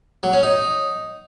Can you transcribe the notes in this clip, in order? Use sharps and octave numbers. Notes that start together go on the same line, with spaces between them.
F#3
C#4
D#4